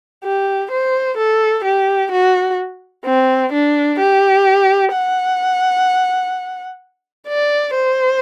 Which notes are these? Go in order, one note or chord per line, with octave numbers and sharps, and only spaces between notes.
G4
C5
A4
G4
F#4
C4
D4
G4
F#5
D5
C5